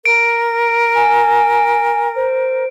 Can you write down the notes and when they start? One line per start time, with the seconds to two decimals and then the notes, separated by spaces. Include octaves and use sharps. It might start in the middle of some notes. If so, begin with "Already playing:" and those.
0.05 A#4 D7
0.94 G#5
2.15 C5